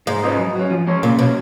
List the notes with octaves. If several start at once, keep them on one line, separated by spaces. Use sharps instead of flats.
G#2 G#3
C#4 F4 B4 D#5
F#3
C#4 F#4
F3
G#3 C#4 G#4 C#5
A#2 C#3
B2 F#3 C#4